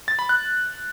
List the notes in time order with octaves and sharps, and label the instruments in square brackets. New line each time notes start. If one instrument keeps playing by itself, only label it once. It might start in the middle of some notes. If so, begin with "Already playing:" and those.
[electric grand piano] A6
B5
F#6